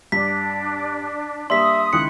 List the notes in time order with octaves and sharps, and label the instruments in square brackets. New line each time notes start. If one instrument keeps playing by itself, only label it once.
[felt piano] G2 [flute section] D4 [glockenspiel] B6
[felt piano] G3 A#3 D4 [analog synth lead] E5 [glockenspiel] C6 B6 [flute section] D#6
[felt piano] C#2 D#3 E4 [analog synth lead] F#6 [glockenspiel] C#7